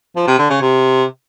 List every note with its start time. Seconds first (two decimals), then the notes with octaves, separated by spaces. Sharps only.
0.16 F3
0.27 C3
0.38 D3
0.50 C#3
0.61 C3